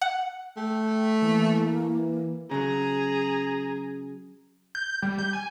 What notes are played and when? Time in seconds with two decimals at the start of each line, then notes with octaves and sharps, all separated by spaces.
0.02 F#5
0.57 A3 G5
1.22 E3 A#3
2.51 C#3 F#3 G#4 A#5
4.75 G6
5.02 G3
5.19 G6
5.33 G#5